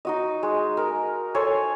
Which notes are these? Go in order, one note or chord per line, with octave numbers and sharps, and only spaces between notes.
D#4 F#4 D#5
G#3
A#4
A4 C5 C#5 G#5